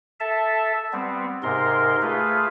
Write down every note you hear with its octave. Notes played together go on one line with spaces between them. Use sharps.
A4 E5 A5
G3 B3 C4
G#2 C3 A#4 C6
A3 F4 G#4 B4